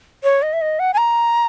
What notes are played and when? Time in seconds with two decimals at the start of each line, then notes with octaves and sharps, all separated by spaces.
0.24 C#5
0.42 D#5
0.53 E5
0.61 D#5
0.79 F#5
0.94 G#5
0.98 A#5